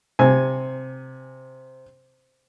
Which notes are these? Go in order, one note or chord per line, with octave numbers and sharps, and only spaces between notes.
C3 G#5